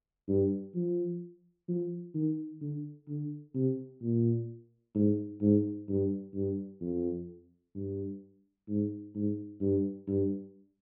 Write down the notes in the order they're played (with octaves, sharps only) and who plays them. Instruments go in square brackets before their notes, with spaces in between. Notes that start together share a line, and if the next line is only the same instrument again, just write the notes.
[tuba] G2
F3
F3
D#3
D3
D3
C3
A#2
G#2
G#2
G2
G2
F2
G2
G#2
G#2
G2
G2